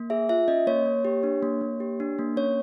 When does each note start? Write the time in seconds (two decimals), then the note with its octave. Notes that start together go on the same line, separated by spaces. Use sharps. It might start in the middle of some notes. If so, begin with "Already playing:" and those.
Already playing: A#3
0.10 G#4 E5
0.29 F4 E5
0.48 C#4 D#5
0.67 A#3 C#5
0.86 A#3
1.05 G4
1.23 D4
1.43 A#3
1.61 A#3
1.80 G4
2.00 D4
2.19 A#3
2.37 C#4 C#5